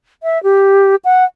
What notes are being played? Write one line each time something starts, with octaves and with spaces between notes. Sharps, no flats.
E5
G4
F#5